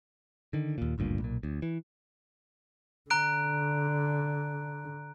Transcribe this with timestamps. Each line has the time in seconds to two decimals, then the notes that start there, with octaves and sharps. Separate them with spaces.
0.53 D3 D#3
0.78 D#2 A#2
0.98 G#1 D2 G2 A#2
1.20 B1 A#2
1.43 D2
1.62 E3
3.10 D3 A#5 F#6 D7